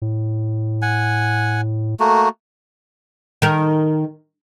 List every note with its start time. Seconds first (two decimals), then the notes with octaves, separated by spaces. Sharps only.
0.02 A2
0.82 F#5 G#5
2.00 A3 A#3 F#4
3.42 D#3 A#4